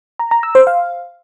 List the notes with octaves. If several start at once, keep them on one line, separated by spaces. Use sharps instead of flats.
A#5
A#5
E6
C5
F5